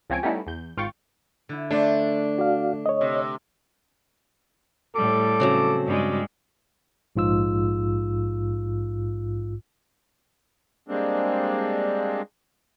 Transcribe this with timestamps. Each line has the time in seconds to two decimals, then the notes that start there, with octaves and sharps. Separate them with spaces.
0.10 C#2 F3 C4 C#5 G#5 D7
0.23 G3 A3 B3 C#4 D#4 E4
0.47 E2 G6
0.77 G#1 F4 F5 G5 C#6 A6
1.49 D3 E4
1.71 A3 D4 C5
2.38 F#4 D5 F5
2.86 C#5 D#5
3.01 C3
4.96 A2 G3 A4 D6
5.40 C#3 F#3 C4
5.86 G2 G3 G#3
7.16 A#1 G#2 F4 E6
10.88 G3 G#3 A#3 C4 D4